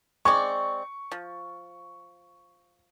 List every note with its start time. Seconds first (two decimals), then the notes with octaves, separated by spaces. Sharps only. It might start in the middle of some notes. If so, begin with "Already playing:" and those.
0.25 G#3 C4 D5 C#6
1.12 F3